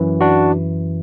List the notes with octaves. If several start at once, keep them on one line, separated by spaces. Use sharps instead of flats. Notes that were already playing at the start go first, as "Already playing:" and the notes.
Already playing: F#2 E3
D4 F#4